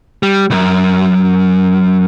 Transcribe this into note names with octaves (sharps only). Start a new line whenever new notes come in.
G3
C2 F#2